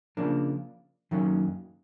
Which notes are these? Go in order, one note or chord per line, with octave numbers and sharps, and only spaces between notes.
C#3 F3 A#3 D4
F#2 D#3 F#3 A#3 C#4